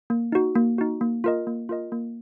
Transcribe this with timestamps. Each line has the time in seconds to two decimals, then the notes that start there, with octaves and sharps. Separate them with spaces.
0.10 A#3
0.32 D#4 F#4
0.55 A#3
0.78 D#4 F#4
1.01 A#3
1.24 F4 A#4 D#5
1.47 A#3
1.69 F4 A#4 D#5
1.92 A#3